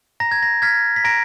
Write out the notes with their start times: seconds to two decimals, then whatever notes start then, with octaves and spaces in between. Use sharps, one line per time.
0.20 A#5 A#6
0.31 G#6
0.42 A#6
0.62 F6 G#6 B6
0.96 B6
1.04 A#5 A#6 D7